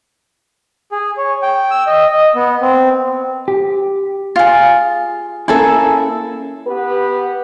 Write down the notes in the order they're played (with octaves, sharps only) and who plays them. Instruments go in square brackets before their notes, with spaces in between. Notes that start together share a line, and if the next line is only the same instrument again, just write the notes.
[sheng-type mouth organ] G#4
C#5
G5
E6
D#5
D#5
B3
C4
[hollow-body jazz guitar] G4
[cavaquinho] F4 G#4
[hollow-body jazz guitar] A#3 C#4 E4 [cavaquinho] G#4 A4 E5
[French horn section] B3 G4 B4